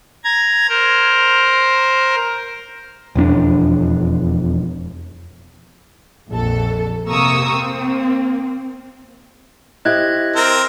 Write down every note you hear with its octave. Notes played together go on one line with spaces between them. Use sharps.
A#5 G#6
A#4 C5
E1 F2 C#4 D4
A#1 F2 A4
C3 A#3 A#5 C#6 D#6 E6
A#3 C4
E4 G4 C5 D#5 F#6 G#6
C4 A#4